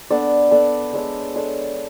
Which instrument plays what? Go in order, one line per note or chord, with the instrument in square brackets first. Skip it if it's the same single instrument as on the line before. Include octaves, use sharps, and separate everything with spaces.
[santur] B3 D4 A4 D5
B3 D4 A4 D5
G#3 D4 A4 C#5
G#3 D4 A4 C#5